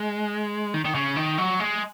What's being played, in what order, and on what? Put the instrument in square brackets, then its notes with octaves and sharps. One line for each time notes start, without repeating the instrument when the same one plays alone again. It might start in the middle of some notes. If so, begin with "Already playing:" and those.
Already playing: [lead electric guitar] G#3
D#3
D#3
C#3
D#3
F#3
G#3